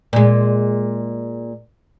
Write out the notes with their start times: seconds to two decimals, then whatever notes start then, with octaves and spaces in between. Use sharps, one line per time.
0.13 A#2 G#3